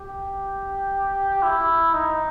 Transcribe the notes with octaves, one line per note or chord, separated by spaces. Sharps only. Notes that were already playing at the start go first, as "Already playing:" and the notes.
Already playing: G4
E4
D#4